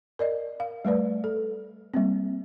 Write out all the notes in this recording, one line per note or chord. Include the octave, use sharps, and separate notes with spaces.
A#4 D5 D#5
F5
G3 A3 B4 D5
A4
G3 A#3 C4